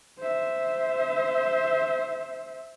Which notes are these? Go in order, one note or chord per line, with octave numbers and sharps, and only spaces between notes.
C5 E5